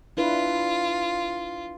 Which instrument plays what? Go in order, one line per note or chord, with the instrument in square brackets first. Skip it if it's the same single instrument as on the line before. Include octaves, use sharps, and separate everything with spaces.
[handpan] D4 E4 B4 [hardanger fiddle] F4